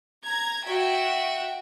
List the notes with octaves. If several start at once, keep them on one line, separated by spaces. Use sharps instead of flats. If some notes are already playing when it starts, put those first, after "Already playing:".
A#5 G#6
F#4 E5 G5